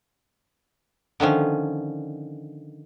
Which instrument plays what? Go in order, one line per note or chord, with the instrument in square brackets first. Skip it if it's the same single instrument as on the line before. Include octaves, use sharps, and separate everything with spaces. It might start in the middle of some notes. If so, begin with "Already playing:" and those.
[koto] D3 D#3 F3 C#4